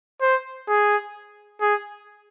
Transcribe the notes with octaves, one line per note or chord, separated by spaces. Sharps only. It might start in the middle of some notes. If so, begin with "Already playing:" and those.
C5
G#4
G#4